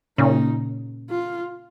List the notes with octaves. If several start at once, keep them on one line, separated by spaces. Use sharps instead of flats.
A#2 C#3 D#4
F4